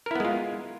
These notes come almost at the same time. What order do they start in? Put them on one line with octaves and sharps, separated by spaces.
A#4 E4 B3 G#3 F4